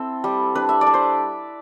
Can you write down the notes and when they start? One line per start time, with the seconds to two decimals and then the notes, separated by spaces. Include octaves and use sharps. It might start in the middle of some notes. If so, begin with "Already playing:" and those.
Already playing: C4 E4 A4
0.24 G3
0.55 D4 B4
0.69 E5
0.81 D5
0.87 D4
0.94 C5